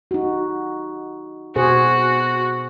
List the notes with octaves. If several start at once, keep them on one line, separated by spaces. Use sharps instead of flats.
D#4 F#4
B2 F#4 G#4 C5